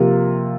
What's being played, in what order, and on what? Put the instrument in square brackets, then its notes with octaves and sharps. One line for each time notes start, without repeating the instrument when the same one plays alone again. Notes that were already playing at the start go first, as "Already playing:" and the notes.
Already playing: [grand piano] C3 F3 A#3 F4